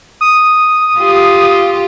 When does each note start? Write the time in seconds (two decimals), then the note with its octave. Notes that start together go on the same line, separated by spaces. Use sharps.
0.21 D#6
0.99 F4 G4